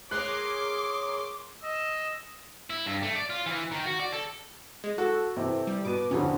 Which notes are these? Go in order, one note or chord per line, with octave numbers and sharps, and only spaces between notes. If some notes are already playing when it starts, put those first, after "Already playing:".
G#4 A#4 C#5 C6 D6 F#6
D#5 E6
E4
G2
A3
D5
F4
E3
D#3
F#4
D5
A4
G#3
F#4 A4
C3 E3
G3
B2 B3 D6 D#7
E1 F2 D3 C#4